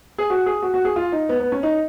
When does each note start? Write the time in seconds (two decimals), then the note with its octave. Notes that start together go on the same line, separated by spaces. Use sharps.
0.18 G#4
0.30 F#4
0.46 G#4
0.62 F#4
0.74 F#4
0.85 G#4
0.96 F4
1.12 D#4
1.29 B3
1.40 B3
1.52 C#4
1.63 D#4